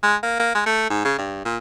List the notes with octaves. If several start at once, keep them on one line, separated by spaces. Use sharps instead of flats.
G#3
A#3
A#3
G#3
A3
G#2
C#3
G2
A#2